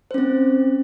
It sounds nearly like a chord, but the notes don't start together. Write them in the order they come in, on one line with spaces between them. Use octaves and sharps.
C5 C#4 C4